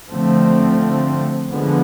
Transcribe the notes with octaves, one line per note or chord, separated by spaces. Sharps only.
D3 F3 A3 C4
D3 F3 G#3 B3